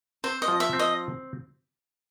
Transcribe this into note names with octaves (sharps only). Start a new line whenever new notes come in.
C4 C5
D#5
F3
E5
C4
D#5